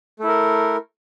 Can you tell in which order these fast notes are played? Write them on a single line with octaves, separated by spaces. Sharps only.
A3 E4 A#4